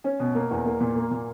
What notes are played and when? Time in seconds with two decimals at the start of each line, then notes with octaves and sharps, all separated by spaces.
0.04 C#4
0.20 B2
0.35 A#3
0.51 E2
0.65 A#3
0.80 A#2
0.96 A#3
1.11 A#2